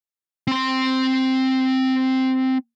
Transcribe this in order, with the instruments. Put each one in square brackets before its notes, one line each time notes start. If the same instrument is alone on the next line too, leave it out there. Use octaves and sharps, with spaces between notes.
[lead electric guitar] C4 C6